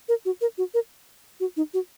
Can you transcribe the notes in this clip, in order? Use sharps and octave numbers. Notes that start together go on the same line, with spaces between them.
A#4
F#4
A#4
F#4
A#4
F#4
D#4
F#4